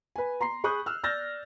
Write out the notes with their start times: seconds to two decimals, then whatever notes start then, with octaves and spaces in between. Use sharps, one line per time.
0.16 B4 G#5
0.41 A#5 C6 C7
0.64 G#4 B5 C#6 D#6 F#6 G6
0.86 E6 F6
1.03 D5 E6 F6 G6 A6 A#6